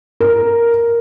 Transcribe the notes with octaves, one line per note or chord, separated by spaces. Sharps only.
A#4